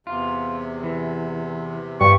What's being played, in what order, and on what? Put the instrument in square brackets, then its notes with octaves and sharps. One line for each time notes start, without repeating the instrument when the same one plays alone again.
[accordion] E2 C3 [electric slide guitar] F4
[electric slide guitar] E3
[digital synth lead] G2 [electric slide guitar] F4 G4 [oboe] C#6